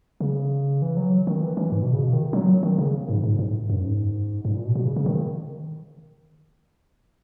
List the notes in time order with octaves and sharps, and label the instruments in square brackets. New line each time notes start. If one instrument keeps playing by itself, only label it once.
[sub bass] C#3
E3
F#3
D#3
E3
E3
G#2
B2
C#3
B2
D#3
F#3
D#3
C#3
G#2
G#2
G#2
F#2
G#2
G#2
A#2
B2
B2
C#3
C#3
D#3